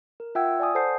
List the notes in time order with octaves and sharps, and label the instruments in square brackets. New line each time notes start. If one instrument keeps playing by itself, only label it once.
[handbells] A#4
F4 E5 F#5 G5 E6 G#6
D5 G#5 D#6
A4 C5 F#5 A5 G6 C7